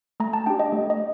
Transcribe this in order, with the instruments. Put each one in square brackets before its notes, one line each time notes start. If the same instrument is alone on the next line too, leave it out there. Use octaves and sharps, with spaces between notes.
[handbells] A3 A#5
A5
D4 G4 G5
D#5
A3
D#5